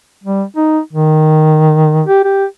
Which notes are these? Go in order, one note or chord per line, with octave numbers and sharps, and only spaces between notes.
G3
D#4
D#3
G4
G4